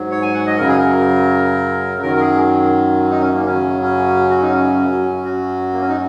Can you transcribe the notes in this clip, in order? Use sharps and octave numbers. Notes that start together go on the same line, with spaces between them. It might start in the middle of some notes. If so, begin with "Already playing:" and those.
Already playing: G#2 F#3
C#5
G#5
F#5
D#5
F#2 C#3 F#3 A#4
G#4
A#4
F#2 D#3 F#3 A#4
A#4
G#4
D#4
C#4
A#3
F#2 C#3 F#3 C#4
C#4
F#4
D#4
C#4
F#2 F#3
F#4
A#3
C#4
D#4